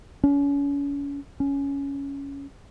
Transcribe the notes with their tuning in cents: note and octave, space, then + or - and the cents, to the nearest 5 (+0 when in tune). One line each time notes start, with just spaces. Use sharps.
C#4 +35
C#4 +10